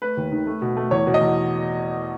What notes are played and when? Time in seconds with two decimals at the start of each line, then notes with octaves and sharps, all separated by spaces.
0.02 A3 B4
0.17 D#2
0.32 D#3
0.47 A3
0.62 B2
0.77 A3
0.91 E2 C#5
1.07 B2
1.14 D#5
1.21 E2